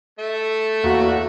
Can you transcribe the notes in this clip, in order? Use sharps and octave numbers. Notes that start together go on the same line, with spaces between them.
A3 E5
E2 A#3 F#4